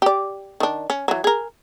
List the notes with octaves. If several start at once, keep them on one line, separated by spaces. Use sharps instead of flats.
G4 D5
D#3 D4
C#4
E3 F#3
G#4 A#4